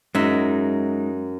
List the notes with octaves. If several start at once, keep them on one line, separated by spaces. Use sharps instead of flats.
F#2 G#3 D#4 E5